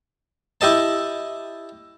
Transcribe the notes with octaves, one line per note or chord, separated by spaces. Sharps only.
E4 G4 D#5 A5